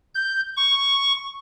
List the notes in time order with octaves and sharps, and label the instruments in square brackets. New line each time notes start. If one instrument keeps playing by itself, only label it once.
[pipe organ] G6
C#6